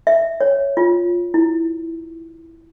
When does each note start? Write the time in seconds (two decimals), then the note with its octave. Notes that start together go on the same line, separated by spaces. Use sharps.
0.07 E5
0.40 C#5
0.77 F4
1.34 E4